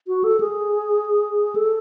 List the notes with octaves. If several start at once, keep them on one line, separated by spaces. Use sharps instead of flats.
F#4
A4
G#4
A4